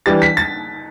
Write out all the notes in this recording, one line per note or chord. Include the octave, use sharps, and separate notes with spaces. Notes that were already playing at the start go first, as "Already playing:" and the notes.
E3 G3 D4 A6
B6
A6